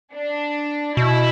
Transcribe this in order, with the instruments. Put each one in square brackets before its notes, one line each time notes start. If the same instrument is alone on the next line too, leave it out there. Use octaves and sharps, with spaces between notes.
[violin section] D4
[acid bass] B2 [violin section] E4